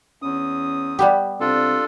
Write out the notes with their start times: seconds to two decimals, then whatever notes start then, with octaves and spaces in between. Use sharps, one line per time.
0.22 E2 C#4 D#6
0.99 G3 B3 G4
1.40 C3 D4 F4 A4